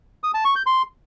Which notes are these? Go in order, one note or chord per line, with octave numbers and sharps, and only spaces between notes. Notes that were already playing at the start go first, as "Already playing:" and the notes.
D#6
A5
C#6
G6
C6